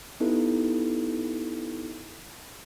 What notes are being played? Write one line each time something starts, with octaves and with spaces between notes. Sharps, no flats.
B3 D#4 E4 G4 A4 B4